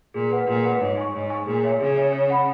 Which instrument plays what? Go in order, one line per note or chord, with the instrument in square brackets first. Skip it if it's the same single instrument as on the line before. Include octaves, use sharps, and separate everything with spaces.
[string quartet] A#2 [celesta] G#4
[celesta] B4 F#5
[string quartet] A#2 [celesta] G#4
[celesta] B4 F#5
[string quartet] G#2 [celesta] C#5
[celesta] G#5 C#6
[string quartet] G#2 [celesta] C#5
[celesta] G#5 C#6
[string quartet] A#2 [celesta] G#4
[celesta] C#5 E5 G#5
[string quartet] C#3 [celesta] G#4
[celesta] C#5 E5 G#5
C#5
F#5 B5